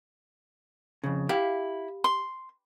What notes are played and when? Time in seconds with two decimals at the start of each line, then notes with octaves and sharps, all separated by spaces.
1.04 F2 C#3
1.29 E4 G4 F5 G5
2.04 C6